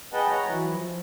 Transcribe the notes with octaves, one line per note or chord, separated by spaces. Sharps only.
G#4 B4 D#5 F#5 G5 A5
C#5 F#5 A#5
E3 F#3 E4
F3